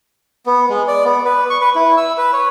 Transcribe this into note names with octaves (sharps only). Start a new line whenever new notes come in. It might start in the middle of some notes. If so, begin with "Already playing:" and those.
B3
G#3
D5
B3
B4
C#6
B4
E4
E6
B4
C#5